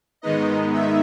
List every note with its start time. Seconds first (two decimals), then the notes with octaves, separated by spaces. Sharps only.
0.22 G#2 D#3 G#3 B3 D#4 D#5
0.73 E5